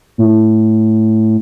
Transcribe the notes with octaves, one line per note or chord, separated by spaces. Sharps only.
A2